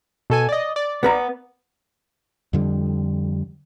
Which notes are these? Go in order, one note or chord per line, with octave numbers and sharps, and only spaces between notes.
B2 A4 G#5
D5 D#5
D5
B3 B4 A#5
F2 D3 G3